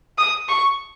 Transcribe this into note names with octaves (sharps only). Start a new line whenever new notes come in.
D#6
C#6